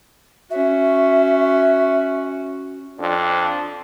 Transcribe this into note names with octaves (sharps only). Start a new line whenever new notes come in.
C#4 F#4 E5
F2 D4